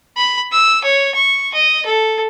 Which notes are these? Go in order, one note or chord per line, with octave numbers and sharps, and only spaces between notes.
B5
E6
C#5
C#6
D#5
A4